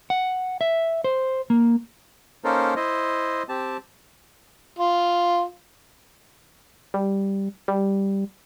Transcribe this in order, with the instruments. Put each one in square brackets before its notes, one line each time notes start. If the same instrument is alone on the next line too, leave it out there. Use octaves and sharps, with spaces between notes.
[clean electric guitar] F#5
E5
C5
A#3
[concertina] A#3 C#4 D#4 A4 A#4 C5
E4 C5 D#5
C4 G4 A5
[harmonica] F4
[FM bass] G3
G3